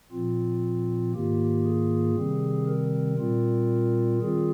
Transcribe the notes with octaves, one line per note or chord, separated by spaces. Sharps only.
A#2 F3 C4 F4
G#2 D#3 A#3 F4 G4
G#4
C3 D#3 G3 C4
A#4
A#2 G3 C4 F4
D#3 G3 C4 F4 G#4